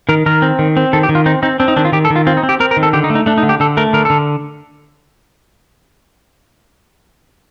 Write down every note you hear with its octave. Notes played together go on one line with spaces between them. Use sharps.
D#3 A#4
D#3 A#4
C4
D#3
C4
D#3 A4
G4
D#3
F4
C4 D#4
C4 D#4
C4 D4
D#4
D#3 D4
F4
D#3 G4
A4
D#3
F4
C4 F4
D#4
C4
G4
C4 A#4
A#4
D#3
A4
D3 G4
D#4
A3
D#4
A3 D4
D#4
D3
G4
D3 A4
A3 A#4
D3 A#4
D3 A4